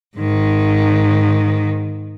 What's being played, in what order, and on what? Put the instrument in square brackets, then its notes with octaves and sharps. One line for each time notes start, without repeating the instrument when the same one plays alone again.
[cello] G#2 D#3